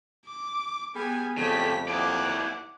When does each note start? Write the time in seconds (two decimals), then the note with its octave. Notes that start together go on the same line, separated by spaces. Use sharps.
0.26 D6
0.95 G3 B3 G#4 G#5
1.37 F2 C#3 G3 A3 B6
1.88 D#2 E4 D5 F#5 D6